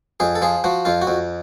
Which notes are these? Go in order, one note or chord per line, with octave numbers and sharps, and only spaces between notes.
F2 G#4
A4
F3 G#4
F3 F#4
F2 F4
F#4
F2